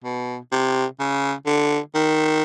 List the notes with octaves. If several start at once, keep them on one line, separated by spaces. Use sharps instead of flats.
B2
C3
C#3
D3
D#3